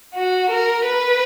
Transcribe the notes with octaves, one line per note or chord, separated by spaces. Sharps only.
F#4
A#4
B4